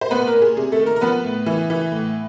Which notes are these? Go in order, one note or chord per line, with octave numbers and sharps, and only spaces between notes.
C5
A#2 B3 B4
A#3 A#4
A#2
G#4
C3 G#4
A3 A4
D#3
A#3 A#4
A#4
F3 B3 B4
A2
E3
E3
A2